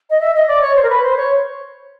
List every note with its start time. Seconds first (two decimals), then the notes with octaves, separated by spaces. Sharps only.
0.10 D#5
0.21 E5
0.35 D#5
0.47 D5
0.62 C#5
0.76 C5
0.83 A#4
0.90 B4
1.03 C5
1.17 C#5